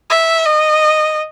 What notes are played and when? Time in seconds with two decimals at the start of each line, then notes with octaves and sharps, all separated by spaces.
0.10 E5
0.46 D#5